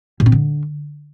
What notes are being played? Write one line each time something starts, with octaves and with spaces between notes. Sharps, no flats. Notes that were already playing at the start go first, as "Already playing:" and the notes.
A#2
C4
D3